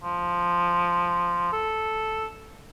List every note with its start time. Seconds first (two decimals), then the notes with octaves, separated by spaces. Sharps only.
0.04 F3
1.52 A4